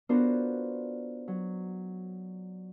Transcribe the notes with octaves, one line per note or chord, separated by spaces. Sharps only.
B3 D4 F4 F#4 A#4 C5
F#3